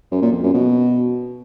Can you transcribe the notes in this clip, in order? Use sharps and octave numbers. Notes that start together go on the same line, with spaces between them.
F#2
A#2
F2
F#2
B2